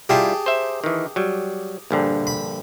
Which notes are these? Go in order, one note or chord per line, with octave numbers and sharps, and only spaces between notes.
G3 E4 F4 G4 G#4 A5
C5 E5
D#3 E3
F#3 G3
A#1 G2 D3
B5